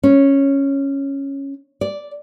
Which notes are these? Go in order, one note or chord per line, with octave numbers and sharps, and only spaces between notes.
C#4
D5